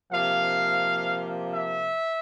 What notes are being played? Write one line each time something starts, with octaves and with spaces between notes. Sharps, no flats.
C3 F3 A#3 F5
E5